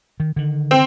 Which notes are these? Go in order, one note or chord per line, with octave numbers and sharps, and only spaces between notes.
D#3
D3 D#3
C4